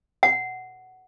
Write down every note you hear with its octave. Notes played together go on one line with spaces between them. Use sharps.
F#5